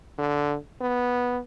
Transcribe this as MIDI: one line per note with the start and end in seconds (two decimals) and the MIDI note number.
0.18 0.57 50
0.81 1.41 59